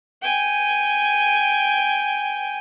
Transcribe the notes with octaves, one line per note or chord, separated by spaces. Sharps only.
G5 G#5